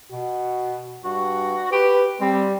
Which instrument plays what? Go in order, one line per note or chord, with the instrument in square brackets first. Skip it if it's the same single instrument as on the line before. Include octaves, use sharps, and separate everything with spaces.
[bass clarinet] B2 [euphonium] F#4
[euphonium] G2 [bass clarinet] F#4
[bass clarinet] G4 [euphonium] B4
[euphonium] G3 [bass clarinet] C4